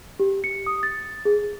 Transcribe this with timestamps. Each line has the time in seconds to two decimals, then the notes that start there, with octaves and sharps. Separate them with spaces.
0.20 G4
0.44 C#7
0.67 D#6
0.83 A6
1.25 G#4